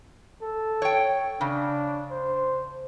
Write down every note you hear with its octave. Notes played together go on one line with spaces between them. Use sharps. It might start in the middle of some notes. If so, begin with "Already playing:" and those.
A4
C#5 G5
C#3 D4
C5